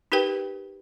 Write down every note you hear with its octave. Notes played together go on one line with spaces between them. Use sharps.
D#4 G4 A#4 B4 G5